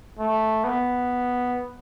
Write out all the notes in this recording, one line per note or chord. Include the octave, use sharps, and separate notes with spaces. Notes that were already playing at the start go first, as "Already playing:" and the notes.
A3
B3